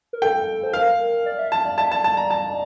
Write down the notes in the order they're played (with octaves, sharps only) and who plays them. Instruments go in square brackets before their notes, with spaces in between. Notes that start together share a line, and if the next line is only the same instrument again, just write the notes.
[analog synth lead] A#4
[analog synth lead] A4 [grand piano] G5
[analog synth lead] C5
[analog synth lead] A#4 [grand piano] F5
[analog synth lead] D5
E5
[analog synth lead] E5 [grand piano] A5
[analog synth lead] D5
[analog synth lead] E5 [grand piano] A5
[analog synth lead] D5 [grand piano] A5
[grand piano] A5
A#5
A5